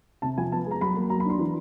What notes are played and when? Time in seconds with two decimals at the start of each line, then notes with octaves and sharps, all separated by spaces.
0.22 C3 A5
0.38 F3 G#5
0.51 B3 A5
0.66 G#3 A#5
0.81 F#3 B5
0.96 A#3
1.10 F#3 A#5
1.20 B5
1.26 D4 C6
1.39 E3